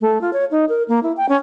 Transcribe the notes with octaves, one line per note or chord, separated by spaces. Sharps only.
A3
F4
C#5
D#4
A#4
A#3
E4
G5
C#4